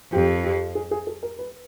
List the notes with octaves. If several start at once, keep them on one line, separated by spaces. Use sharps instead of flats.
F2 G4
G4
G#4
G#4
A4
A#4
B4